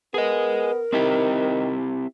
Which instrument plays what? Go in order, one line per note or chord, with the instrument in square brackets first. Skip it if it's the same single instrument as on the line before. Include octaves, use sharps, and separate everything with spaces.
[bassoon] B3 [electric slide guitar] G#4 D#5 [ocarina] A#4
[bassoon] D#3 [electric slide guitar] C4 E4 G4